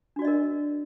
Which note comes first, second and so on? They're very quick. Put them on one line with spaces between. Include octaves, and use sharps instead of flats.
D4 F#4 D5 D#5 A#4